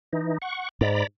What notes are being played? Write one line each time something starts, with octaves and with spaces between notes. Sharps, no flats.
E3 D#4
F#5 C#6
G#2 D5 A#5 B5